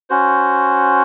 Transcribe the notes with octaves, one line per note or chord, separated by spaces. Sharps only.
C#4 F#4 C5